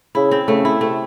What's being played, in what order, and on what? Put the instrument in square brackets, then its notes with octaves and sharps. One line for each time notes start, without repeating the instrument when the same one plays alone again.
[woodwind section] C#3 [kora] E4
[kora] C4
[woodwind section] C#3 [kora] A3
[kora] E4
[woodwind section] C3 [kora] A3